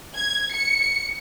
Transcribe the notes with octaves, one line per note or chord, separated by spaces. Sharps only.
G#6
C#7